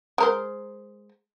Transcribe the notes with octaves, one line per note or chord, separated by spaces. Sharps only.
G#3 A#4 C5